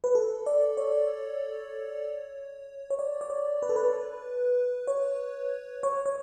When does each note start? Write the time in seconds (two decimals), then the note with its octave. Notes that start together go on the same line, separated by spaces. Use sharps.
0.04 B4
0.15 A4
0.46 D5
0.77 C#5
2.90 C#5
2.99 D5
3.21 D5
3.30 C#5
3.62 B4
3.69 A4
3.76 B4
4.87 C#5
5.83 C#5
6.06 C#5